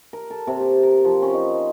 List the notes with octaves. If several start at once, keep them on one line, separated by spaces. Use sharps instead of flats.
A#4
A4
C3
G4
A#4
F3
C#4
D#4
C5